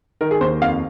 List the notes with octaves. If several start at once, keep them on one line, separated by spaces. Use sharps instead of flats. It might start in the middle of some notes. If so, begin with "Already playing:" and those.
D#3 A#4
G#4
D#2 C5
F2 F5